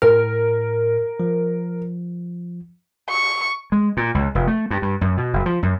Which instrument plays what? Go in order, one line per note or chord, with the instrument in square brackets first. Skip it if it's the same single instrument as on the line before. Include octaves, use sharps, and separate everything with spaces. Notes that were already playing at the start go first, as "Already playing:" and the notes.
[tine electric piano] A2 F6 [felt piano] A#4
[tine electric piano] F3
[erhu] C#6
[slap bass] G#3
A#2
C#2
F1
A3
G2
G2
F#2
B2
F#1
F3
F#2